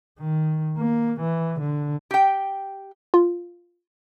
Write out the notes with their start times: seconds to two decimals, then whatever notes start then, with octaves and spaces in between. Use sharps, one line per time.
0.20 D#3
0.77 A#3
1.20 E3
1.60 D3
2.11 G4 G5
3.14 F4